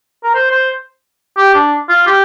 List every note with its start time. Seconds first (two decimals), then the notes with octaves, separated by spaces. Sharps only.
0.24 A#4
0.35 C5
0.51 C5
1.37 G4
1.55 D4
1.89 F4
2.07 G4